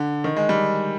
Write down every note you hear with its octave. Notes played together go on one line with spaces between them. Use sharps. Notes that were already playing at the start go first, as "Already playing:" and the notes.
Already playing: D3
D#3
G#3
G3